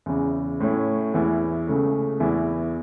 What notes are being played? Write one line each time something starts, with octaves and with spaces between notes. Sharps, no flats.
E2 C#3 E3
A2 A3 C#4 E4
E2 E3 B3 E4
C#2 C#3 A3
E2 E3 B3 E4